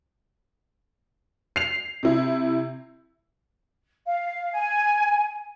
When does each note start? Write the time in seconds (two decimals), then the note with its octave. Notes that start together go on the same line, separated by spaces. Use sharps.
1.56 C7 F7
2.03 C3 E4
4.06 F5
4.52 G#5